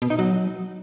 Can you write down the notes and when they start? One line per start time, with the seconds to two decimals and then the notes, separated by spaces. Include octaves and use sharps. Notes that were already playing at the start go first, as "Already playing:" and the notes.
0.02 B2
0.10 D#4
0.19 F#3